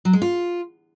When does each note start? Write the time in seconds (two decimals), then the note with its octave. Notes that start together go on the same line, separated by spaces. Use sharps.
0.05 F#3
0.13 G#3
0.22 F4